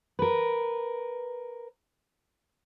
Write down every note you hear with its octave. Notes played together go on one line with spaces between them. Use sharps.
A#4 B4